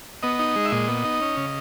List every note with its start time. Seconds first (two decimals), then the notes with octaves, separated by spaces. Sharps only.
0.23 B3 D#5
0.39 D#4
0.56 G#3
0.65 E5
0.72 A#2 D#5
0.88 B3
1.04 D#4
1.21 C#4
1.37 C#3